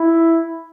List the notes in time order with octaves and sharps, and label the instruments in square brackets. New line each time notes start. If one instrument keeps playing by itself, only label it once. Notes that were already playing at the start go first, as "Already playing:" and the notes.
Already playing: [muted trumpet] E4